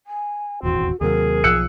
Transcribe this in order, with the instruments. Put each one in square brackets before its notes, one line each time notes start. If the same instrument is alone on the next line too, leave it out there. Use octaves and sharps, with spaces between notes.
[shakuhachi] G#5
[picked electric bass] D#1 G#1 E2 [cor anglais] C4 [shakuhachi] F#4
[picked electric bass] D#2 C3 F#3 [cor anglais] G#4 [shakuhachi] A#4
[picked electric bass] B1 F3 [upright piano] E6 F#6 C#7